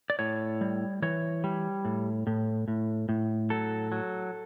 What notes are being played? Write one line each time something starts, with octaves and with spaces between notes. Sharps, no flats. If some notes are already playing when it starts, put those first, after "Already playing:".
D5
A2 C#5
G3
E3 C#5
G3
A2
A2
A2
A2
F#3 A4
F#3